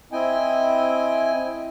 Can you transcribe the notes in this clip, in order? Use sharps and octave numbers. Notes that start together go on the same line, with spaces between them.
C4 E4 D#5 G5 G#5